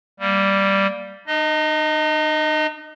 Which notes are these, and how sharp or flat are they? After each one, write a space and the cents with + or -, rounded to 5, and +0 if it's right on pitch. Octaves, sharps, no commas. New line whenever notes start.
G3 +0 A#3 +0
D#4 -40 D#5 +0